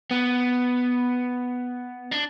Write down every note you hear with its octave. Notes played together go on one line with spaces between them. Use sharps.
B3
D4